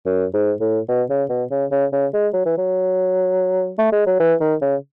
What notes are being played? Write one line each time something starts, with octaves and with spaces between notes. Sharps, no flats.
F#2
G#2
A2
B2
C#3
B2
C#3
C#3
C#3
G#3
F#3
E3
F#3
A3
G#3
F#3
E3
D#3
C#3